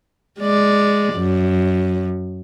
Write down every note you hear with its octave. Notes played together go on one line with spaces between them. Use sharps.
G#3 D5
F#2